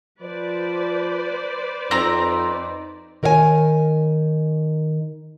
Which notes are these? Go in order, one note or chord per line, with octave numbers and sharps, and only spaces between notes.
F3 B4 C5 D5
F2 C4 D#4 A#5
D#3 A#4 C#5 E5 G#5